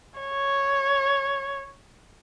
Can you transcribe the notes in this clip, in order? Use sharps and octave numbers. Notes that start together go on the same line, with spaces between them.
C#5